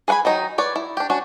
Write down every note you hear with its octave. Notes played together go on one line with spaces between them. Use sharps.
G#4 B4 F#5 G#5 B5
D#3 F#3 D#4
B4 C#5 D5
E4
D4 G4
C#4 D4 F#4